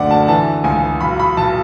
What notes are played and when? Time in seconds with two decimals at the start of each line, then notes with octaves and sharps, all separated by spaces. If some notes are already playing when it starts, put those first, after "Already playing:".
Already playing: F#1 D2 D3 D5 F#5
0.11 A5
0.28 E3 A5
0.64 C#2 G#5
1.00 B1 B5
1.19 B5
1.37 B1 A5